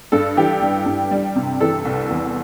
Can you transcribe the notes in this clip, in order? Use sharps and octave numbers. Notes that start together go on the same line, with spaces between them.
G2 A4
E3 G4
G3
G2
G3
C3
E3 A4
C2
E2